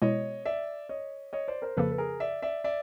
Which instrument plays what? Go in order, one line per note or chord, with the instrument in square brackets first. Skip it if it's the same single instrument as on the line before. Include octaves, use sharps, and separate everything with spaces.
[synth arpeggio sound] B2 G#3 B3 E4 [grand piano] C#5 D#5
[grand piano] D5 E5
C#5 D#5
C#5 D#5
C5 D5
A#4 C5
[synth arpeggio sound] F2 C#3 F3 A#3 [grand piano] A4 B4
[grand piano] B4
G#4 A#4
D5 E5
D5 E5
D5 E5